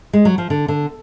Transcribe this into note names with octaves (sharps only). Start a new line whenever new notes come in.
G#3
F#3
F3
D3
D3